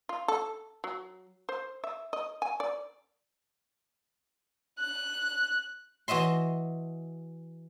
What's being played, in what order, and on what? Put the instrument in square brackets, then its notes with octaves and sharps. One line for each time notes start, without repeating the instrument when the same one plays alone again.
[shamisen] F4
A4
F#3
C5
E5
D#5
G#5
D5
[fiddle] F#6
[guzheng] E3 F#4 D#5 E5 C6